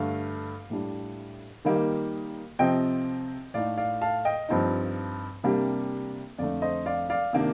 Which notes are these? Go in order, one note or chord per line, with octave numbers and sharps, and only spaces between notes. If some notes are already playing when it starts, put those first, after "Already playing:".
Already playing: G2 D3 A3 F5
A2 G3 D4
D#3 G3 A#3 D#4
C3 F3 C4 D#5 G5
A2 A3 D#4 D5 F5
D5 F5
F5 A5
D#5 G5
G2 F3 C4 D#4
C3 G3 A#3 D4
F2 D3 A3 D5 F5
C5 D#5
D5 F5
D5 F5
C3 D#3 A#3 D4